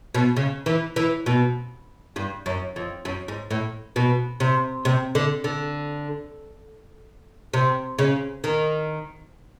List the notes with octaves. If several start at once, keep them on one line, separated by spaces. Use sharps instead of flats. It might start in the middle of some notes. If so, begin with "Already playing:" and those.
B2
C#3
E3
E3
B2
G2
F#2
F2
F#2
G#2
A2
B2
C3
C3
D3
D3
C3
C#3
D#3